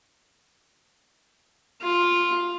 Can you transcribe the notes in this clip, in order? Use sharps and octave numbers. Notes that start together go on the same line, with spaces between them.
F4